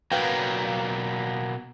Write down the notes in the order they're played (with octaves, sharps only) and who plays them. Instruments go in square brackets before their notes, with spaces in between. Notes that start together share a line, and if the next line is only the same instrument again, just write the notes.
[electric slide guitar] B2 F#3 A#3 [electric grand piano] B4 F5 G5